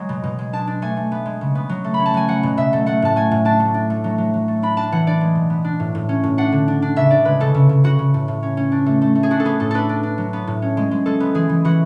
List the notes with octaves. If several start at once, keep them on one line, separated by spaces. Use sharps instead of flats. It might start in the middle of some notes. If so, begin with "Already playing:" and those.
Already playing: F#3 G#3
B2
B2
G#3
D4 A5
D4
A3 G#5
A3
B3
G#3
C#3
B3
F#3
A3
B5
C#4
A5
F#3 G#5
F#3 F#5
B2
B2 E5
A3
A3 F#5
A2 A5
A3 G#5
A2
D4 A5
A3
D4
A3
F#3
F#3
F#3
A3
D4 B5
D4 A5
E3 F#5
D4 D5
G#3
B2
B3
D4
A2
A2
C#4
A2
D4 F#5
D3
D4
D4
C#3 E5
D4 D5
G#3 B4
C#3 A4
C#3
C#3
C#3 F#4
C#3
A2
A2
C#4
C#4
D4
A3
A3
A3
G#4
D4 F#4
A4
B3 G#4
A2 A4
D4 A4 B4
D4
D4
F#3
B3
A2
C#4
G#3
G#3
G#3 A4
B3
E3 G#4
E3
E3 F#4